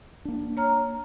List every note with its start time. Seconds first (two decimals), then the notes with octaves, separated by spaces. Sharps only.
0.25 A#3 D4
0.57 C#5 A#5 F6